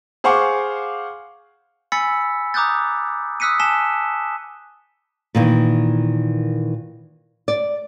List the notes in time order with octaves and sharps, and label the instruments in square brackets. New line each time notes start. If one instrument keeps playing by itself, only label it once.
[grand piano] G#4 C5 F5 F#5 C#6 D6
[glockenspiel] G#5 B5 E6 A6 B6 C#7
A#5 D6 D#6 F#6 G6 A6
D#6 E6 F#6 B6 C#7 D#7
G#5 A5 B6 E7 G7
[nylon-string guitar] A#2 D#3 E3
D5